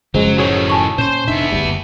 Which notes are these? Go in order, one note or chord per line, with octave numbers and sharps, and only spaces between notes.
F#1 C#3 F3 F#3 G#3 C#4 C5
A2 D#3 F#4 G#4 C#5
G#5 A5 C#6
A#2 C#4 C5 C6
F1 B3 D4 D#4 E5
F#1 D2 G2 G3